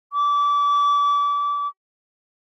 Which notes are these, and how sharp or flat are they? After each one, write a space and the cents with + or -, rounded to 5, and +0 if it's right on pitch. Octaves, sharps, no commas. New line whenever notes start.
D6 -30